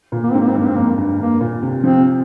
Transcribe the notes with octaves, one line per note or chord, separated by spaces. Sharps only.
A#2
A#3
G#2 C4
A#3
C4
G2
A#3
C4
F2 A#3
G2
G2 A#3
A#2
C3
F3 C4